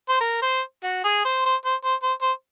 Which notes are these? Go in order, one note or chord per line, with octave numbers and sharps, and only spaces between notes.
C5
A#4
C5
F#4
G#4
C5
C5
C5
C5
C5
C5